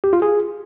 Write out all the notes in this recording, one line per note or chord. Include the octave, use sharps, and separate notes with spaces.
G4
F4
G#4